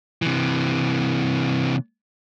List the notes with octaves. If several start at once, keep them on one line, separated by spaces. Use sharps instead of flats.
C3 E3